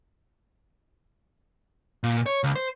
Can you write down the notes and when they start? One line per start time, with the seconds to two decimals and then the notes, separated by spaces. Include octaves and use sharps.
2.04 A#2
2.26 C#5
2.44 C#2
2.56 C5